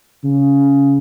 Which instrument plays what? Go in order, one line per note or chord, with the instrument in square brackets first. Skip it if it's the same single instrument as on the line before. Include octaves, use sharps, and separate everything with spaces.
[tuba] C#3